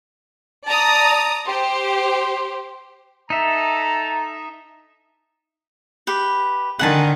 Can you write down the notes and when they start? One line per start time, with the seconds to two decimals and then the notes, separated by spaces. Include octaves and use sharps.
0.66 D5 A5 A#5 D#6
1.48 G4 C5 C6
3.30 D#4 A4 E5 A5 A#5
6.07 G4 B4
6.79 D3 D#3 F#5 G#5 A5